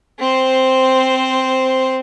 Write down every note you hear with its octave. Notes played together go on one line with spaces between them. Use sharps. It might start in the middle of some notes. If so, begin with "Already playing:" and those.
C4 C5